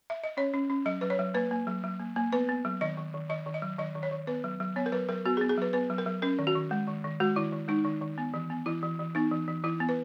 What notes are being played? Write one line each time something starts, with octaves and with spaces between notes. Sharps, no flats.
E5
D#5
C#4 C#5
C#4
C#4
F#3 D#5
F#3 B4
C#5
F#3
A#3 B4
A#3
F#3
F#3
A#3
A#3
B3 B4
B3
F#3
D#3 D#5
D#3
D#3
D#3 D#5
D#3
D#5
F#3
D#3 D#5
D#3
C#5
D#3
B3 B4
F#3
F#3
B3 C#5
A#4
F#3 B4
F#3 A#4
B3 F#4
G#4
B3
G#4
F#3 B4
B3 B4
F#3
A#4
F#3
C#4 A#4
D#3
F#4
D#3
G#3
D#3
D#3
G#3 F#4
D#3 E4
D#3
G#3 D#4
D#3
D#3
B3
E3
B3
E3 E4
E3
E3
B3 D#4
E3
E3
E3 E4
B3
B4